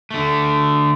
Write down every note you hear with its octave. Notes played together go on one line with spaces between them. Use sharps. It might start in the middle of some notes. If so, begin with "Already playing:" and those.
D3 A3